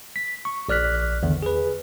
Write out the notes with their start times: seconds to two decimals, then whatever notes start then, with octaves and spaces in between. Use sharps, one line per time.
0.16 B6
0.45 C#6
0.68 A#1 D5 F6 F#6 B6
1.23 E2 D3 D#3
1.42 G#4 B4